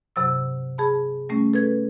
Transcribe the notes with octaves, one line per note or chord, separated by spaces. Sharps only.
G2 C3 F#3 E6
G#4 A5 B5
G3 A3 C#4
A4 B4 G#6